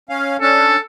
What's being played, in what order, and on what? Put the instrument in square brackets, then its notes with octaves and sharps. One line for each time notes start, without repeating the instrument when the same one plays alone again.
[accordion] C#4 F5
[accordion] C#4 D4 [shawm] A4